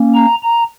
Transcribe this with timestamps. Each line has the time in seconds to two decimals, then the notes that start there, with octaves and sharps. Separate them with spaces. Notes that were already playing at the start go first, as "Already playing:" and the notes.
Already playing: A#3 C#4
0.14 A#5
0.43 A#5